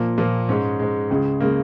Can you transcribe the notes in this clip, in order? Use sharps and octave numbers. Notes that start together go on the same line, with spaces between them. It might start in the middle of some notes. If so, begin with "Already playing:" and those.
Already playing: A#2 F3 A#3
A#2 F3 A#3
G#2 G#3 C#4
G#2 G#3
C#2 C#3 G#3
C#3 G#3 A#3